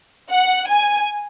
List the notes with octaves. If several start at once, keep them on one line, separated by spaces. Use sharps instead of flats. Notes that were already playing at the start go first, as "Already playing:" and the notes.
F#5
G#5